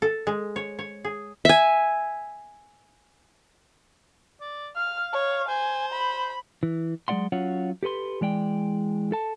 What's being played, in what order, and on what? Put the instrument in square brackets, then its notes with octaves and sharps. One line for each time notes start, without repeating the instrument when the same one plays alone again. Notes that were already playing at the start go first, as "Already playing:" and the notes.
[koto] A4
G#3
C#5
C#5
G#4
[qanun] E5 G#5
[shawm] D5
[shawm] F5 [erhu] F6
[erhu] C#5
[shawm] C5 [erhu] G#5
[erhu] B5
[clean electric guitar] E3
F#3 G#3 C#4 D5 F#5 C6
F#3 C#4 F4 C#5 F#5
G4 A4 B4 C6
E3 G#3 D5 G5
A4 A5